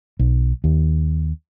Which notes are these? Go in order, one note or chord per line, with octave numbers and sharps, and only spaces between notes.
B1
D#2